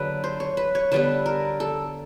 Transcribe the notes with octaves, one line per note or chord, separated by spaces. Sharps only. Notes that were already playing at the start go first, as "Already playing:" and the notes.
Already playing: D3 F#3 A#3 G#4 B4
C5
C#5
B4
C#5
D3 G3 B3 B4
A#4
A4